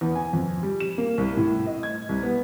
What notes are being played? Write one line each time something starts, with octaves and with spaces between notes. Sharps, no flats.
E2
G#5
F2
G3
E7
A#3
C2
A2
D#5
G#6
C2
B3